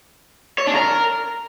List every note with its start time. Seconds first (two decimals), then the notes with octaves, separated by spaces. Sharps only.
0.58 C#5
0.67 D4
0.75 A#4